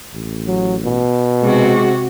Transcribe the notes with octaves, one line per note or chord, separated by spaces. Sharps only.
A1
F#3
B2
C3 G#3 F#4